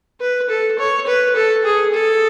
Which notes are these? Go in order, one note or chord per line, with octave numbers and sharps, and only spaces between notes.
B4
A4
C#5
B4
A4
G#4
A4